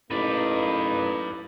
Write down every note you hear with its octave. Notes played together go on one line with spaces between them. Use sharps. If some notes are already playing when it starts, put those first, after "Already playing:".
A1 A#3 D#4 B4 D5